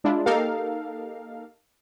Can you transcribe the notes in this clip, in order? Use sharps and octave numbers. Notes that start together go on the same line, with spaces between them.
G#3 D4 E4 F4
A#3 D#4 G4 A4 A#4 F5